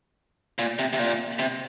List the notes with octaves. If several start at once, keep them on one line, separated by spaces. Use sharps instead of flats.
A#2
C3
C3
A#2
C3